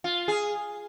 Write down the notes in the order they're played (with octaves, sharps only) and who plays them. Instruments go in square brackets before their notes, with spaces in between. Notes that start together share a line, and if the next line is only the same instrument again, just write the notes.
[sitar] F4
G#4